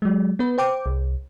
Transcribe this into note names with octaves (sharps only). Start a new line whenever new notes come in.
F#3 G#3
B3 B4
C5 G5 D6
C2